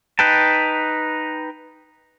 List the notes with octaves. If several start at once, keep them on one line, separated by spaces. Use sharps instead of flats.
D#4 B4 G5 A5